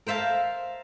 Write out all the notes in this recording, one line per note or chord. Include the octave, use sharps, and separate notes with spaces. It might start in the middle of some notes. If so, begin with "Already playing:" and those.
A#4 C5 E5 F5 A5